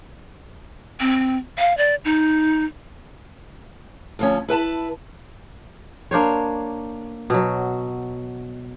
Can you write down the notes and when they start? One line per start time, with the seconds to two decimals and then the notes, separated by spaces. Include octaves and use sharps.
1.00 C4
1.58 F5
1.77 D5
2.05 D#4
4.19 D2 F3 C#4
4.48 E4 B4 G#5 A5
6.11 A#3 D4 C5 C#5
7.30 B2 F#3